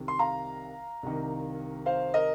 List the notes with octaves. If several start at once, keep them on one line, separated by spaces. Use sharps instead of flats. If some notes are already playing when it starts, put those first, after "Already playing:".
Already playing: C2 C3 D#3
C6
F5 A#5
C2 C3 D#3
C5 F5
A#4 D#5